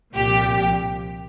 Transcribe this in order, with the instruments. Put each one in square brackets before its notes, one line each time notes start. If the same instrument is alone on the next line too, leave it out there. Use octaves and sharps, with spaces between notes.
[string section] C2 A#2 F3 G4